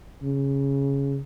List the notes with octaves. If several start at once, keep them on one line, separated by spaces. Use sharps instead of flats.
C#3